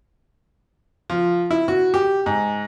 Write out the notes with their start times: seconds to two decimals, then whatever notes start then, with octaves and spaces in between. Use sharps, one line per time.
1.10 F3
1.51 E4
1.68 F#4
1.94 G4
2.26 G#2